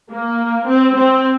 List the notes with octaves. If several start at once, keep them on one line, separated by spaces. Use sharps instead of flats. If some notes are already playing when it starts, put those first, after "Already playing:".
A#3
C4
C4